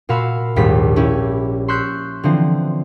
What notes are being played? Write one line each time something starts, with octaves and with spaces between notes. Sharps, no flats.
A#2 F#4 F5 B5 C6 E6
A#1 D#2 G#2 G3 B6
C#4 E4 G4
C6 C#6 E6 F#6 G6 B6
D3 E3 F3 C4